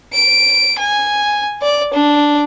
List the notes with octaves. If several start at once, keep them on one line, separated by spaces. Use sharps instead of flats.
D7
G#5
D5
D4